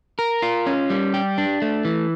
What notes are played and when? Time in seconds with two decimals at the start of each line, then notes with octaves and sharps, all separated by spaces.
0.19 A#4
0.42 F4
0.66 C#4
0.90 G3
1.14 G4
1.38 D4
1.62 A3
1.85 E3